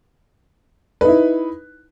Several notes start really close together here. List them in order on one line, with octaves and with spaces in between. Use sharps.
B4 D#4 E4